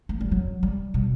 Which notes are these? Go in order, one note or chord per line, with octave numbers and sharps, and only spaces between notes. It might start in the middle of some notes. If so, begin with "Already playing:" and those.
A3
G3
F#3
G3
B2